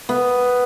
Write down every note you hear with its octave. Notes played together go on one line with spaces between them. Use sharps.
B3